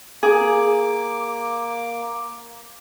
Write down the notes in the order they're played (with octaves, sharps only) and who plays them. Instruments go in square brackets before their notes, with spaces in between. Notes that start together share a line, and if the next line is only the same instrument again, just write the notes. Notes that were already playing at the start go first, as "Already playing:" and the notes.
[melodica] A#3 D6 [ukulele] G#4